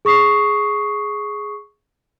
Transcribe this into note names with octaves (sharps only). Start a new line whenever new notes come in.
G#4 C#6 D#6 C7